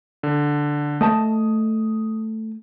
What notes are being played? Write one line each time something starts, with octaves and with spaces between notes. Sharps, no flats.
D3
A3 D#5 A5 D#6